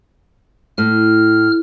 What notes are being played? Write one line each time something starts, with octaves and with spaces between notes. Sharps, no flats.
A2 F6